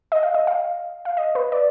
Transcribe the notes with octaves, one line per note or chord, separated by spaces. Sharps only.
D#5
F5
D#5
F5
F5
D#5
B4
D5